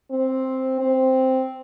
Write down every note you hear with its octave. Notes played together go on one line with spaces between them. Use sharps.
C4
C4